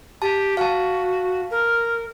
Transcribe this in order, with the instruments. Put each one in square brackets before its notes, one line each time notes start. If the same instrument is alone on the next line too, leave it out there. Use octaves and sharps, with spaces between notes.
[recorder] G4 [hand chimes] A5
[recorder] F#4 [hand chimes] F5 A5
[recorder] A#4